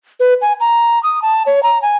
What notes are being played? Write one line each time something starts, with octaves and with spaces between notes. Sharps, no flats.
B4
G#5
A#5
D#6
A5
C#5
A#5
G#5